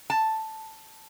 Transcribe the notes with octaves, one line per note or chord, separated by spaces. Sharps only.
A5